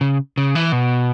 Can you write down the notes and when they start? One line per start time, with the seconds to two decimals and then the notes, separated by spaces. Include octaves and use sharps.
0.01 C#3
0.37 C#3
0.55 E3
0.72 B2